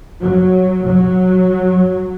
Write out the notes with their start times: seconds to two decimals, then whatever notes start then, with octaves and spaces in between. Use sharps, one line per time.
0.20 F#3
0.86 F#3